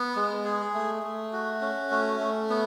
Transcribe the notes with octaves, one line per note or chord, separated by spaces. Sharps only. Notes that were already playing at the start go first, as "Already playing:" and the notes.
Already playing: B3
G#3
G#4
A3
A3
F#4
C#4
A3
A3
B3